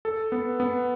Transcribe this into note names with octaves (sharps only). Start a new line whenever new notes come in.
A4
B3
B3